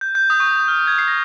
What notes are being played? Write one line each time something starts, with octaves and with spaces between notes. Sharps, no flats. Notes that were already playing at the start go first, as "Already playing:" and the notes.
G6
G6
D#6
C#6
D#6
D#6
F6
G6
G#6
C7
A#6